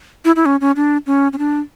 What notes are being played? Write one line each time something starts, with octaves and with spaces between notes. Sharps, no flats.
E4
E4
C#4
C#4
D4
C#4
C#4
D4